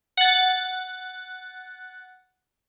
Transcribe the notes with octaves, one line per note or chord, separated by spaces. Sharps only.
F#5 A6